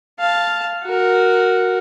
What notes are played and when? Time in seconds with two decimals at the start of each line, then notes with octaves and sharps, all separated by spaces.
0.19 F5 A5
0.84 F#4 A#4